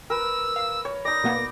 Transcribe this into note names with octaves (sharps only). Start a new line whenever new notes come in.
A#4 B4 E6
F5
C#5
D#4 D5 A#6
B2 A#3 B3